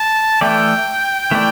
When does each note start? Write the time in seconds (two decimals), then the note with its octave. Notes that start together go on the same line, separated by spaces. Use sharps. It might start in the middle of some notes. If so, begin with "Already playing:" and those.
Already playing: A5
0.41 E3 A3 E4 A4 D5 G5
1.31 E3 A3 E4 A4 D5